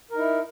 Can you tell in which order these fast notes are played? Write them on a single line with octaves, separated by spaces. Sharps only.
A#4 D#4 E4